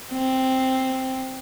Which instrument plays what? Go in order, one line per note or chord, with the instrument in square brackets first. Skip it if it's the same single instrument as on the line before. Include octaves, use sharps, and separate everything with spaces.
[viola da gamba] C4